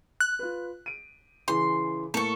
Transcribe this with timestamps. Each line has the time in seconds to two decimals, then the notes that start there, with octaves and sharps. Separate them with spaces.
0.20 F#6
0.39 F4 B4
0.86 D7 D#7
1.48 C#3 E3 C6
2.14 A2 A#3 A4 C#6